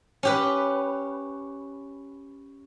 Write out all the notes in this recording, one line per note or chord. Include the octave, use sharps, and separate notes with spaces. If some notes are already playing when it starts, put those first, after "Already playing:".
C#4 G4 B4